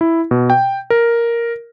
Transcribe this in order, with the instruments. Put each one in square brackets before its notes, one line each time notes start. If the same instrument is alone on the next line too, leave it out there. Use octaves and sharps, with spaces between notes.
[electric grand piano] E4
B2
G5
A#4